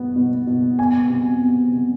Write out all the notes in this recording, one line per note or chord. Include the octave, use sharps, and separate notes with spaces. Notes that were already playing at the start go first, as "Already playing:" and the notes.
Already playing: B2 B3
B2
B2
B3 G#5
C3
B3
C3